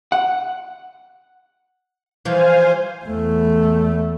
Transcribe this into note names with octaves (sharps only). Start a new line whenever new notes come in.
F#5
E3 F3 G3 C5 F5 G#5
E2 A3